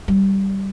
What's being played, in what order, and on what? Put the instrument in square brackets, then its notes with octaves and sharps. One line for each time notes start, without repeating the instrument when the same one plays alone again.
[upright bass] G3